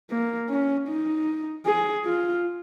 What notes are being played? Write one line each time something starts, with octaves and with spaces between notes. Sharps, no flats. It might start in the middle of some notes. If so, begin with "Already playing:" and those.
A#3
C#4
D#4
G#4
F4